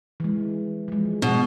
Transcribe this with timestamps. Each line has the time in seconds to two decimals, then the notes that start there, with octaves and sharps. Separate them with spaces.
0.20 E3 G#3
0.88 F3 G#3
1.22 B2